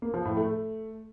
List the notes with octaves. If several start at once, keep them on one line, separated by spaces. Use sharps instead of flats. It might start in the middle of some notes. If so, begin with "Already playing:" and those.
A#3
F3
A2
A3